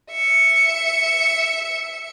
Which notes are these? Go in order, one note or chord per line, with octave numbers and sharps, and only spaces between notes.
E5 C#7